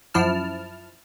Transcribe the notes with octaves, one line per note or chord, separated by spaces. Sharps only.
F#2 F3 E4 A5 F6